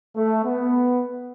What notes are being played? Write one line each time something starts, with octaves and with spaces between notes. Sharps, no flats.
A3
B3